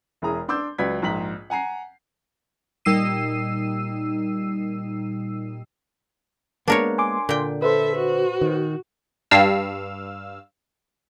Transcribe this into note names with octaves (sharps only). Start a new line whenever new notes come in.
E1 E4 G#4 A#5 D#6
D4 C6 D6 E6 G6
C#2 F#3 B4 D5 G#6 B6
A#1 G#2 A#5 B6 F#7
F#5 G#5 A#5 C7
A#2 G3 D#4 E6 C7 D#7
G#3 A#3 B3 D4 A#4 C#5
G#5 C6 D6
A#2 D3 G5
A4 B4 C5 E5
F#4
D#3
G2 F5 E6